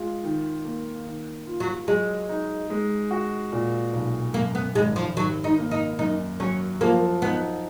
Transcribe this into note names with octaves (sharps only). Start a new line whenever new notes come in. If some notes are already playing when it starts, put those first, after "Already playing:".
Already playing: G#3 F4
D#3
A#3
D#3
F4
F#3
F#3 G#3
D#4
G#3
F#4
A#2
B1
F#2 A#3
B3
G#1 G#3
F3
D#3 F#3
D#4
A#3
D#4
F#2 D#4
F#3 C#4
F3 A#3
B3 D#4